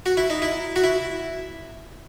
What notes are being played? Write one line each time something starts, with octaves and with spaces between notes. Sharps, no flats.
F#4
E4
D#4
E4
F#4
E4